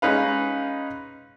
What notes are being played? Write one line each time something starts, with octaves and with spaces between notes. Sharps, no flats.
G#3 C#4 D#4 B4 F5